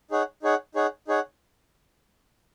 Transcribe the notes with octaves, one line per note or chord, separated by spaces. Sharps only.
D#4 G#4 C#5 F#5
D#4 G#4 C#5 F#5
D#4 G#4 C#5 F#5
D#4 G#4 C#5 F#5